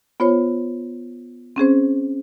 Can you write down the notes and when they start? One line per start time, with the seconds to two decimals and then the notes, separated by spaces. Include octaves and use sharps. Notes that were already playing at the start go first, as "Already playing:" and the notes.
0.20 B3 F4 C5 C#5
1.56 C4 C#4 G#4 C5